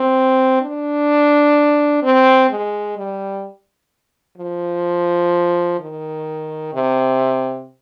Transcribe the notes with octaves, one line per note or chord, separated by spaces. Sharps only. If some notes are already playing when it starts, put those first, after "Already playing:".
Already playing: C4
D4
C4
G#3
G3
F3
D#3
C3